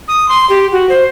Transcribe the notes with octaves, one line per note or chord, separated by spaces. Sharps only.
D#6
C6
G4
F#4
C5